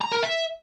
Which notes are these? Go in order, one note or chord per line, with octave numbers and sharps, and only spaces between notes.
A#5
A#4
E5